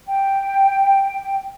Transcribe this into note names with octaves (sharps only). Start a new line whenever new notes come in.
G5